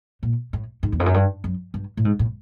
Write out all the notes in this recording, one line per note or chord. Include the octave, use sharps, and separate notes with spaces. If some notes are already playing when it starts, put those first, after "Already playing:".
A#2
A2
G#2
E2
F2
F#2
G2
F#2
G2
A2
G#2
A2